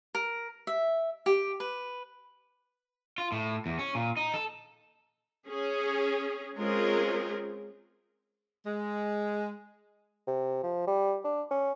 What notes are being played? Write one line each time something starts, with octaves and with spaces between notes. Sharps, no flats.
A#4
E5
G4
B4
F4
A2
E2
C#4
A#2
D#4
A4
C#4 G#4
G#3 C4 C#4 F4 G#4 A#4
G#3
C3
F3
G3
D4
C#4